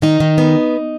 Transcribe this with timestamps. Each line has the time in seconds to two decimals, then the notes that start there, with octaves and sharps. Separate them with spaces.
0.02 D#3 D#4
0.20 D#3
0.38 B3